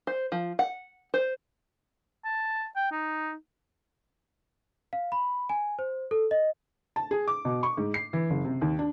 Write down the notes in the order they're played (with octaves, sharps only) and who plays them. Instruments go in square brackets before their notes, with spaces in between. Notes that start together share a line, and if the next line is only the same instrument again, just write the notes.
[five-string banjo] C5
F3
F#5
C5
[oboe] A5
G5
D#4
[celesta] F5
B5
G#5
C5
A4
D#5
[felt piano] A5
G#4
D6
B2
C#6
G#2
C7
E3
F#1
C3
D#2
D4